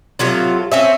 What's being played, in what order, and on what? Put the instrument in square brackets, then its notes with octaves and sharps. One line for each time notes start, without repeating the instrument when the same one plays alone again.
[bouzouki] A2 C3 F#3 F4
C4 C#4 E5